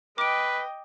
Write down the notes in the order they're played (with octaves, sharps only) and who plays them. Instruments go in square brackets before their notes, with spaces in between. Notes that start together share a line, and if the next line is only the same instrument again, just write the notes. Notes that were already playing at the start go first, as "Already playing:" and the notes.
[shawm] B4 [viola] D#5 G5 [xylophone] D6 D7